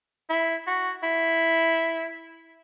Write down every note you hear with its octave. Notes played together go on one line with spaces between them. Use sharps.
E4
F#4
E4